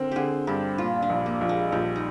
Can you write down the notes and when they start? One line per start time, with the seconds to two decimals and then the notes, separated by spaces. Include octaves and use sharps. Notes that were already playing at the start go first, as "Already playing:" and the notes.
Already playing: D3 C4 A#4
0.11 D3 G4 G#4
0.47 G2 G4
0.78 A#2 F4
1.02 D4
1.10 A#1
1.26 A#3
1.41 A#1
1.49 G#3
1.72 A#1 G4
1.96 D#4